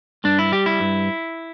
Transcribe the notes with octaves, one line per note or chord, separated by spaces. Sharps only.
G2 D4
E4
G3 G4
E4
G2